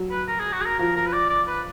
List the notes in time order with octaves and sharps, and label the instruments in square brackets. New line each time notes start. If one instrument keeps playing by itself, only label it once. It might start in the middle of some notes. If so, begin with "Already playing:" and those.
Already playing: [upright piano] F#3
[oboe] B4
A#4
G#4
F#4
G#4
A#4
[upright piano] F3 [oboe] A#4
[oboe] A#4
B4
D5
D5
B4